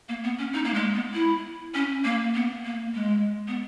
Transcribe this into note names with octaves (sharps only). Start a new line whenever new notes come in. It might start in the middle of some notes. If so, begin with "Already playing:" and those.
A#3
B3
C#4
D#4
A#3
G#3
B3
E4
C#4
A#3
B3
A#3
G#3
B3